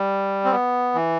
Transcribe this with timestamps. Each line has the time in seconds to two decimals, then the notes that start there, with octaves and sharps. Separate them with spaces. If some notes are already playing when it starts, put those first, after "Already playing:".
Already playing: G3
0.45 C4
0.51 B3
0.95 E3